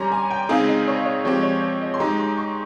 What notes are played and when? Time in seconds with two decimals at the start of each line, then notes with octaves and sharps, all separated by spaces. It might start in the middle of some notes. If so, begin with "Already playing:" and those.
Already playing: G3 C#4 G4 C#5 G#5 A#5 C6
0.12 G#5
0.30 G5
0.49 C#3 G#3 C4 D#4 G#4 F5
0.68 D#5
0.88 C#5
1.06 C#5
1.25 F3 G#3 C4 G4 C#5
1.43 C#5
1.62 C#5
1.82 D#5
1.94 C6
1.99 G#3 D#4 G4 A#5
2.20 C6
2.37 C#6